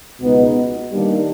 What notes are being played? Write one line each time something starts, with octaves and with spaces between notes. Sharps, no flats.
C#2 B2 G#3 B3 D#4
D#3 G3 A#3 D4